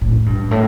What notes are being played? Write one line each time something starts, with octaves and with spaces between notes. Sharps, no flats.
A2
G2
A2